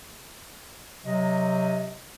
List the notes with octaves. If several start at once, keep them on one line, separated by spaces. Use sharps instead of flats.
C3 F#3 D#5